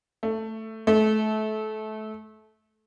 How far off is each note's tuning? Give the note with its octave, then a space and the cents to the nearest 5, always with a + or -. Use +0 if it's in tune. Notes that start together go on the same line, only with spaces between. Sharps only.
A3 +5
A3 -30